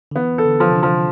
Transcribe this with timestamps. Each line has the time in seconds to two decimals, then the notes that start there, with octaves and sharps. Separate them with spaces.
0.11 D3
0.16 E3 B3
0.38 A4
0.46 D3
0.60 F3
0.70 C3
0.75 D3
0.83 F3